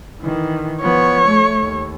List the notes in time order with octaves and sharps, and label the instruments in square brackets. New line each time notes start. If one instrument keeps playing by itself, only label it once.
[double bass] D#3 E3
[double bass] F3 B3 [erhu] C#5
[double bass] A3
D#2